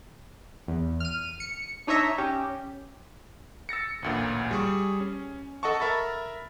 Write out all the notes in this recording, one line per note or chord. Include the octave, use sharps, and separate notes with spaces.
E2
F6 D#7
C#7
D4 D#4 C#5 D#5 E5 A#5
C#4 G4
E6 A6 A#6 C#7
A1 D2 A#2
G3 G#4 C#6
C#4
A4 D#5 F#5 A5 C#6
A#4 E5 B5 A6